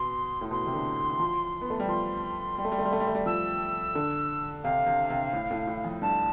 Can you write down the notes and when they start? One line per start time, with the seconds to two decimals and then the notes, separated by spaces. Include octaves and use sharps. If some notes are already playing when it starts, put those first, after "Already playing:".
Already playing: B2 C6
0.41 A2
0.51 B2 C6
0.67 C3
0.74 D3
1.10 E3
1.20 F3
1.61 B3
1.70 A3
1.80 G3
1.88 F3 C6
2.58 G3
2.65 A3
2.72 G3
2.79 A3
2.85 G3
2.93 A3
3.00 G3
3.07 A3
3.15 G3
3.26 F3 E6
3.95 D3
4.63 C3 F5
4.86 C3
5.10 C3
5.33 A2
5.50 A2
5.67 A2
5.84 F2
6.02 G2 A5